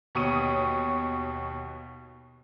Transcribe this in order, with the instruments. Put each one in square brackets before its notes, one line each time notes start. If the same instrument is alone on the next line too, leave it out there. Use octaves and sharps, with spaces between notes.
[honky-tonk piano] D#2 B2 C#5 C#6 D#6 D#7